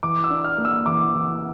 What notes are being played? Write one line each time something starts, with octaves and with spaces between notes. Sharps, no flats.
E3 D6
E6
D4
F6
A#3
E6
E3 D6
E3